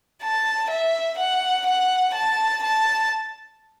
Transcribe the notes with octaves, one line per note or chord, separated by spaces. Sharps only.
A5
E5
F#5
F#5
A5
A5